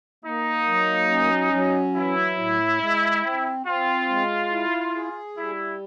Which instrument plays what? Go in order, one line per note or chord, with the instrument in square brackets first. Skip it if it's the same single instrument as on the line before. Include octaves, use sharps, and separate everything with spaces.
[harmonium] A#3 [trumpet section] D#4
[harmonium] F#3
C#4
F#3
[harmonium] E3 [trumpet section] E4
[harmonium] A2
G#3
C4
[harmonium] C4 [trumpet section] F4
[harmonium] G#3
E4
G#4
[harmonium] G3 [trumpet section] E4